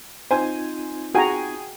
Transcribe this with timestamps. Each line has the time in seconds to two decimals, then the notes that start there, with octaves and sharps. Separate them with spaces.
0.31 C4 D#4 F4 C5 G#5
1.14 F#4 G#4 G5 G#5 A#5